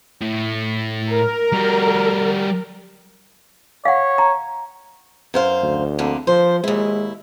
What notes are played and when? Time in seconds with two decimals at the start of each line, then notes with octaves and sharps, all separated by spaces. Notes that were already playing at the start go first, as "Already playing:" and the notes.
0.21 A2
1.10 A#4
1.52 G3 F#4
3.85 C#5 F5 F#5
4.18 A#5
5.34 F#2 C5 F5
5.62 D2
5.99 F2 D3 A#3
6.27 F3 C5
6.64 D#2 G#3 E4